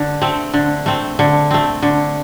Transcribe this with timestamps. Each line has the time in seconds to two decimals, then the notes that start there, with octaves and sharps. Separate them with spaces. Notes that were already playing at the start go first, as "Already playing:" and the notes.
Already playing: D3
0.22 A3 C4
0.54 D3
0.86 A3 C4
1.19 D3
1.51 A3 C4
1.83 D3